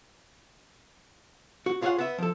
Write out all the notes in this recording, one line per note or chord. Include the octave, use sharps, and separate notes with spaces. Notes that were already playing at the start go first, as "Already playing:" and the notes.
F#4
F4 G#4 C#5 E5 F#5
B3 E5
F3 A4